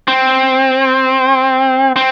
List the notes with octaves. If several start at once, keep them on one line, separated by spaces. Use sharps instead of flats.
C4
C4